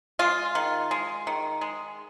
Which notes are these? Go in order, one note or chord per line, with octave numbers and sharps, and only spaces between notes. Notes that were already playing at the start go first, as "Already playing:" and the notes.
G#3 F4
D#3
G#3
D#3
G#3